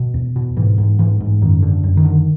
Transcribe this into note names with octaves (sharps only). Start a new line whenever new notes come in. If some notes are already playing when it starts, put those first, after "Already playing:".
Already playing: B2
E2
B2
G#2 E3
G#2
G#2 E3
G#2
F#2 D#3
D3
F#2
D#3
D3